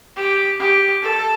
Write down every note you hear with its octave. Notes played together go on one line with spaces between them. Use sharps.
G4
G4
A4